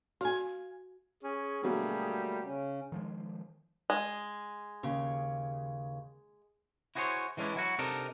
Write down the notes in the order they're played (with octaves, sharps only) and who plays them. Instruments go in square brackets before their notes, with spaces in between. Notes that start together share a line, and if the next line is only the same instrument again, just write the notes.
[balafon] F#4 [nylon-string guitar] F5 G#5
[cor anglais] C#4 [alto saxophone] G#4
[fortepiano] B2 D3 F#3 [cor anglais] G3 [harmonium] A3 A#3
[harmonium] C#3 C#4
[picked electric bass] D#3 F3 G#3
[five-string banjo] G#3
[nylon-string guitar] D#2 C#3
[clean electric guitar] E4 F#4 G#4 C5 C#5
E3 G#3 C#4 D4 E4
F#3 E4 F#4
C3 D4 D#4 A4 A#4